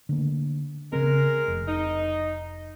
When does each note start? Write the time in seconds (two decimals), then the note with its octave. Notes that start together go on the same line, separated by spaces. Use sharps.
0.09 D3 A3 A#3
0.93 C#3 G#3 B3 C4 A#4
1.48 F1
1.68 D#4